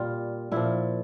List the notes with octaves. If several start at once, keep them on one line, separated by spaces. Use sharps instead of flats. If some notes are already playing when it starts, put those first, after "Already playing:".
Already playing: A#2 G3 F4
A#2 F3 E4